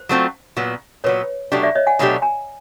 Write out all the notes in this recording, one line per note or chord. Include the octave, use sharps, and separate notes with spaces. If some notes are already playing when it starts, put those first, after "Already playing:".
Already playing: C5
F#3 A3 C4 F4
A#2 F#3 B3
A#2 F#3 B3 B4 C#5
B2 F#3 A3 D4 G4
D5 E5
C#5 D#5
F#5 G#5
B2 F#3 A3 D4 G4
G#5 A#5